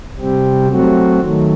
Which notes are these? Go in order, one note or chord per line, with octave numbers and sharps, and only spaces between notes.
C3 G3 C4 G4
F#3 A3 C4 F#4
D#3 F#3 A3